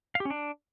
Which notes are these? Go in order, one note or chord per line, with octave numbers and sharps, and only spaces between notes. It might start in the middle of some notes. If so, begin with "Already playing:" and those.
F5
G4
C#4
D4